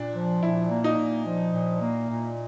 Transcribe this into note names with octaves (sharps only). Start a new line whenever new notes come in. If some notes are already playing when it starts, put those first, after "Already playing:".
Already playing: A#2 D4
F3
A#2 E4
A#3
D#4
A#2
F3
A#2
A#3
A#2